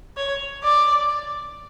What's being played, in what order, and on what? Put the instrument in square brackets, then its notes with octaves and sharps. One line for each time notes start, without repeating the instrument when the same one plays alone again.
[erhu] C#5
D5